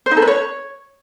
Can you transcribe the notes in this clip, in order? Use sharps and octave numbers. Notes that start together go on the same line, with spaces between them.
C5
D#4
A4
B4
C#5